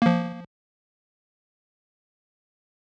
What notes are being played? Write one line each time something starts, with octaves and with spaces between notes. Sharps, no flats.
F3 A#3